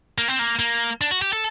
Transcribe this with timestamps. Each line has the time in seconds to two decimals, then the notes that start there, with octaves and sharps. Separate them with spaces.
0.18 A#3
0.28 C4
0.39 A#3
0.59 A#3
1.01 D4
1.11 F#4
1.22 G4
1.33 A4